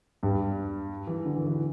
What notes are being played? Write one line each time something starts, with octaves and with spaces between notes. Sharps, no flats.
G2 G3
E3
D3
E3
E3